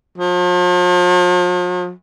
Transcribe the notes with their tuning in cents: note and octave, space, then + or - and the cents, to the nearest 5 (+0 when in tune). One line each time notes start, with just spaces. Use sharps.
F3 +40